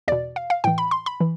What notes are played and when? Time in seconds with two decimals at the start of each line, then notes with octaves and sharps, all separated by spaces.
0.08 E2 B2 D5
0.36 F5
0.50 F5
0.64 A2 E3 G5
0.78 B5
0.91 C6
1.06 B5
1.20 E3